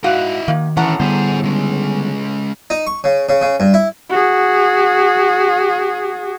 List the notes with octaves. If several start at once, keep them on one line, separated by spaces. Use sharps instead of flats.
G#2 E4 F#4 D#5 F5
D#3 A#3
A2 D#3 E3 C#4 A4 F#5 A#5
D3 G3 B3 G#4 C5
C#3 G#3
D#4
C#6
C#3
C#3
C#3
G2
E4
F#4 G#4